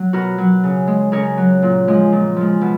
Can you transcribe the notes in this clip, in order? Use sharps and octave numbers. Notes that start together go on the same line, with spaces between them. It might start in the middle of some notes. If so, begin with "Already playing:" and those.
Already playing: F#3
B2 F#4 A#4
F#3
C#3
G#3
C#3 A#4 C#5
F#3
A#2
F3 G#3
A#2
F3 G#3
B2